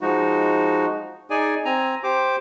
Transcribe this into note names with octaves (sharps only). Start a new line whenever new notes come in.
F3 G#3 D#4 F#4
D#4 G#4 D5 G#5
C4 G#5 A#5
G4 C5 D6